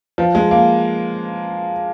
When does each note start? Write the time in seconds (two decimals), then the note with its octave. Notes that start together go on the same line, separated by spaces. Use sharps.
0.18 F3
0.35 G#3
0.51 A#3